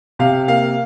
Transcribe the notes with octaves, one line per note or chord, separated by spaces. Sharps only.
C3 F5
A#3 F5